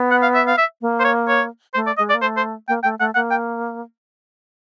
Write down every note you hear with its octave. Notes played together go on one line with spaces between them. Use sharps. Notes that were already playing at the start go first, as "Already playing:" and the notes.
Already playing: B3
F#5
F5
E5
F5
E5
A#3
C5
C#5
C#5
A3 C5
D5
G#3 D#5
D5
A#3
A3 C5
C5
A#3 G5
A3 G5
A3 F#5
A#3 F#5
G5